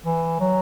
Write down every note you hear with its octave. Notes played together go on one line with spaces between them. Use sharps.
E3
F#3